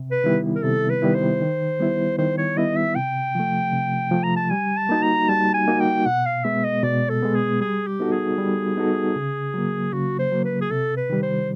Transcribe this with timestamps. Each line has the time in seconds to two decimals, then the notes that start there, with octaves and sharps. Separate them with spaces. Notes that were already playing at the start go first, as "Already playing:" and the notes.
Already playing: C3
0.11 B4
0.24 D#3 G3 B3 E4
0.56 A#4
0.63 C3 A4
0.90 B4
1.02 D#3 G3 B3 E4
1.15 C5
1.41 D#3
1.80 G3 B3 E4
2.18 D#3 C5
2.38 C#5
2.57 G3 B3 E4 D#5
2.77 E5
2.96 C3 G5
3.35 F3 A3
3.73 C3
4.11 F3 A3
4.24 A#5
4.37 A5
4.50 G3 G#5
4.77 A5
4.89 A#3 D#4 F#4
5.03 A#5
5.29 G3 A5
5.54 G#5
5.67 A#3 D#4 F#4
5.80 G5
6.06 B2 F#5
6.26 F5
6.44 G#3 B3 E5
6.64 D#5
6.83 B2 D5
7.10 A4
7.23 G#3 B3
7.35 G#4
7.61 G3 G#4
7.87 G4
8.00 B3 D#4 F#4 A4
8.13 G#4
8.38 G3
8.76 B3 D#4 F#4 A4
9.16 C#3
9.54 F#3 A#3
9.93 C#3 F#4
10.19 C5
10.32 F#3 A#3
10.45 B4
10.61 G#4
10.71 C3 A4
10.97 B4
11.10 D#3 G3
11.23 C5